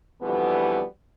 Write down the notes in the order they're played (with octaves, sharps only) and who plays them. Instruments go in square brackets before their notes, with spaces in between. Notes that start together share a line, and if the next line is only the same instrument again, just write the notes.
[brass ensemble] F2 B2 D3 E3 G3 B3